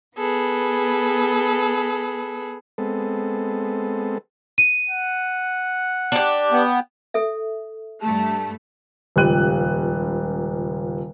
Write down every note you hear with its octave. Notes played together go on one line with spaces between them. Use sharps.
B3 G#4 A4 B4
G#3 B3 C4 A4
D#7
F#5
D4 G4
B3 G5
A4 E5
G2 A3 A5
D#1 C#2 F3 G4 F#6 D#7